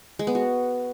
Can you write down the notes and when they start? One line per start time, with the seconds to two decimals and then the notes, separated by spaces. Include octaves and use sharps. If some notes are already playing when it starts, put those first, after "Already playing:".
0.19 G#3
0.27 B3
0.35 F#4